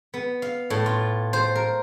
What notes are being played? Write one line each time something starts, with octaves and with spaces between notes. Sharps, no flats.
B3
F5
A2
F4
C5
A#4